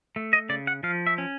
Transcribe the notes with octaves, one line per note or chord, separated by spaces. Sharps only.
A3
D#5
C#3 D5
F#5
F3 F5
E5
C#4